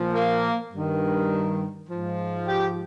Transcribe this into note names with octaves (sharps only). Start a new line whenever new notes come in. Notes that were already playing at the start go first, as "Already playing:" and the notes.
Already playing: A#2 F3
A#3
G2 D#3
G#2 F3
G4